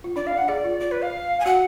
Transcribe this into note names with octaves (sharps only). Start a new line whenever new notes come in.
F4
D4 D5
F5
D4
F#5
G#4 D5
F4
F4 D5
B4
F5
G#5
F#4 F#5